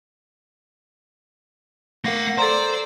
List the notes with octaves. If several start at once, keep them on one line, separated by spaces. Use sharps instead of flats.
A3 A#4 F5 F#5 A#6
A4 C5 D5 A#5 C6 E6